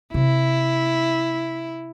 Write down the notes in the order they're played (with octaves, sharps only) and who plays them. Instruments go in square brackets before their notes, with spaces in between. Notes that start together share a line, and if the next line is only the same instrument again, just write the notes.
[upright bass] C3 [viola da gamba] E4